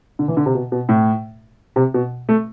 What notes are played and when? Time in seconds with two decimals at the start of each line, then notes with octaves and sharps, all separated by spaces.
0.19 D3
0.28 E3
0.37 D3
0.46 C3
0.55 B2
0.72 B2
0.89 A2
1.76 C3
1.94 B2
2.29 A3